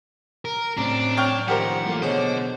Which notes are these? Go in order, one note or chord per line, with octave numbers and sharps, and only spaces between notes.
A#4
A2 C#3 F#3 C4 D4 C5 A#5
C#5 G5 F6
D#3 F3 G3 G4 A#4 C5 F#5
E3 F#3 A3 A#3 F4
B2 D3 G#4 C5 C#5 D#5